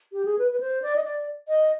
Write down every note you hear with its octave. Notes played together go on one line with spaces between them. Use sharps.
G4
G#4
B4
B4
C5
D5
D#5
D5
D#5